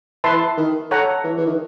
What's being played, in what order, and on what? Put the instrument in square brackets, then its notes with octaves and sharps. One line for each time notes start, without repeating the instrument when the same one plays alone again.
[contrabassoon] E3 [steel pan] B4 E5 A5 C6
[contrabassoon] D#3
[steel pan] A4 C#5 F#5 A#5
[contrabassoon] E3
E3
D#3